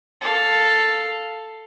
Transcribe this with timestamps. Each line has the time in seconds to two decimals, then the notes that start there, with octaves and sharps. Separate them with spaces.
0.21 A4 F5